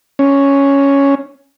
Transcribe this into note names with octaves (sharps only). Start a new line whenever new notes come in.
C#4